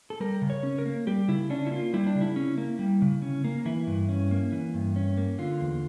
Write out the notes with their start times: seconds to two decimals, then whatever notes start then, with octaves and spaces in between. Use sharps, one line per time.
0.10 A4
0.20 G3 A#4
0.42 C#3
0.50 C#5
0.63 C#4
0.78 A#4
0.86 A#3
1.07 G3 G4
1.28 C#3 E4
1.50 C#4 D4
1.67 E4
1.71 A#3 F4
1.94 G3 E4
2.07 D4
2.15 C#3
2.21 E4
2.36 C#4
2.58 A#3
2.79 G3
3.02 C#3
3.22 C#4
3.44 A#3
3.66 E3 E4
3.87 G2
4.09 C#4
4.31 A#3
4.52 E3
4.74 G2
4.96 C#4
5.17 A#3
5.38 D3 F4
5.61 E2